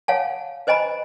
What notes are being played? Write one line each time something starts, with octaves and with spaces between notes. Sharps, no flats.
C#5 F5 F#5 G#5 A5
B4 C5 D#5 G#5 A#5 B5